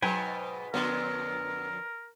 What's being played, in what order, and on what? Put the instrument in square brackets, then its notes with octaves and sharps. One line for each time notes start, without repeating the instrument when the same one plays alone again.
[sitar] G#2 B2 [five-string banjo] F#3 [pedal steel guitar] B4 G5 G#5
[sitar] F2 D3 F#3 [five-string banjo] B3 [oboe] A#4